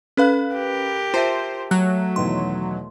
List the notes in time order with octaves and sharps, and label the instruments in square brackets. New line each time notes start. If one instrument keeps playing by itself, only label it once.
[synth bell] C#4 B4 F5 [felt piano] A4 B5 F#6
[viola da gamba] G4 A#4
[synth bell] F4 [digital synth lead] C5 [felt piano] E5 A5
[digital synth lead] F#3 [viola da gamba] A3 [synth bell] F#6
[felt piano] E2 B2 D#3 [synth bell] C6